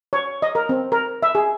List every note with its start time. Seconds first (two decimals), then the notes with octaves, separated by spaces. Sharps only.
0.13 C#5
0.42 D#5
0.55 A#4
0.69 C4
0.92 A#4
1.23 E5
1.35 G#4